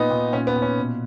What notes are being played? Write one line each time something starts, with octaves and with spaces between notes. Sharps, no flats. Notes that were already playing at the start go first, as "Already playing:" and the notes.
Already playing: A#2 B3 D#4
A#2
A#2 C#4
B3
A#2
C#4
B2